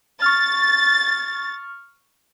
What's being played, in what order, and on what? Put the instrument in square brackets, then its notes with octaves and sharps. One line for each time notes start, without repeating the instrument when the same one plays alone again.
[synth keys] C#6 F6 [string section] A6